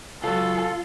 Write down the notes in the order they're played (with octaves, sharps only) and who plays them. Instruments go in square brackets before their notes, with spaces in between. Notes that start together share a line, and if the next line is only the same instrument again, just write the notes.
[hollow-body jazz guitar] C#2 F#3 [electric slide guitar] F4 [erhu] A4